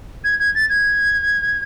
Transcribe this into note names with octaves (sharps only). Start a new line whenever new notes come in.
G#6
G#6
A6
G#6